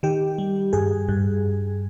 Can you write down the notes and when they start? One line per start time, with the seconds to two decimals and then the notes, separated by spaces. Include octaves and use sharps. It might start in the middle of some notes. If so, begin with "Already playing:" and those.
0.03 D#3 G4
0.38 G3
0.73 G2 G#4
1.09 G2